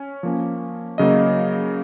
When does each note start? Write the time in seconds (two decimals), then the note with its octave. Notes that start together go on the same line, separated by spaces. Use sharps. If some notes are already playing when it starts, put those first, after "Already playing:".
Already playing: C#4
0.23 F3 A#3 C#4
0.98 C#3 F#3 A#3 D#5